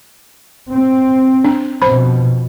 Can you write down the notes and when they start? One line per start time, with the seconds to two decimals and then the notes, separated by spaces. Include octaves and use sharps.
0.71 C4
1.44 D4
1.82 F2 B2 C5 B5